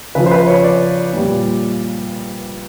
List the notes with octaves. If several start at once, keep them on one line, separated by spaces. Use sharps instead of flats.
C#3 F3 B4
C5
B4
C#5
D5
A#2 G3